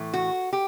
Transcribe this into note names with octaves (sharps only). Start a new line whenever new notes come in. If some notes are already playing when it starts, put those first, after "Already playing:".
Already playing: A2 E3 A3
F#4
G4